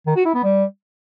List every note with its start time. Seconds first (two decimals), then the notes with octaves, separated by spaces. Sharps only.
0.07 D#3
0.16 F#4
0.25 E4
0.34 B3
0.44 G3